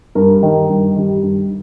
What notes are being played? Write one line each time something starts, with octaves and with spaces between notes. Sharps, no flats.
G2 A#4
D#3 G3
G2
D#3 G3
G2